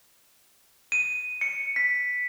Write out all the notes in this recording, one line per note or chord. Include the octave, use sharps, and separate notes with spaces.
D#7
C#7
B6